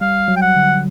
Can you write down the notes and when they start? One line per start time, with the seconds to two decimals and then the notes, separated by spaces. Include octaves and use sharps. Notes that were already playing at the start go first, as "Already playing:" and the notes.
0.01 G3 F5
0.28 F#3
0.36 G5
0.42 F#5
0.56 D3